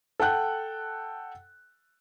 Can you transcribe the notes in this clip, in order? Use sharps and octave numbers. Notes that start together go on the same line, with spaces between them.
A4 F#5 G5 F#6